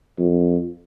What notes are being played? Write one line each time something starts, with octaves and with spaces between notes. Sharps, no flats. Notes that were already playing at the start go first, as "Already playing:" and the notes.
F2